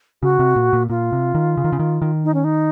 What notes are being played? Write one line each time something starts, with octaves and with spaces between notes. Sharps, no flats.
C#3 F#4
C3
A#2
A#2
A#2 F4
C3
D#3
C#3
D#3
C#3
D#3
D#3
D#4
C#4
D#4